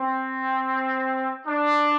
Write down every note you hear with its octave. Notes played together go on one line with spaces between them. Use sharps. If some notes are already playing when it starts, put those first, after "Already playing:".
Already playing: C4
D4